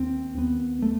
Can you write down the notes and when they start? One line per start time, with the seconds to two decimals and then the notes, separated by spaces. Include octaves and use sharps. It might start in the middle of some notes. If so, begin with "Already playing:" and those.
Already playing: D#2 C4
0.37 D#2 B3
0.82 A3